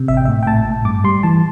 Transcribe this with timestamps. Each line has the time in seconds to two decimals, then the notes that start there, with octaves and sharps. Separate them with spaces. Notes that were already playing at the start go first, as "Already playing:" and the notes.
Already playing: C3
0.08 A1 E5
0.17 G5
0.25 E5
0.28 A2
0.43 G5
0.47 A2 A5
0.65 A2
0.85 G2 D6
1.04 G3 C6
1.23 E3 A5